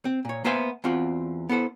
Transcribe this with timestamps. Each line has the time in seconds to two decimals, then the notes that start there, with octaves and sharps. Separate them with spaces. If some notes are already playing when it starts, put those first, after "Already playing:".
0.05 C4
0.25 A#2 C#5
0.44 A#3 B3 C5 E5 G#5 C6
0.84 E2 C4 F4 F#4 D5
1.49 B3 E4 A4 C5